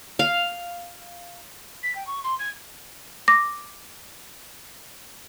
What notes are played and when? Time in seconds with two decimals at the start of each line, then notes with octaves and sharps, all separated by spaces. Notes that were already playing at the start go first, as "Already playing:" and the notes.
0.19 F5
1.83 B6
1.95 G5
2.07 C#6
2.24 C6
2.39 G#6
3.28 D6 A#6